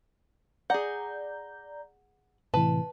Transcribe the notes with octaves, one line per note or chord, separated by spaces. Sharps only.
G#4 D5 F#5 A#5 G6
A2 C3 E3 B4 A5